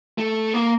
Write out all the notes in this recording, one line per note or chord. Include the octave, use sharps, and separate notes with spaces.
A3
A#3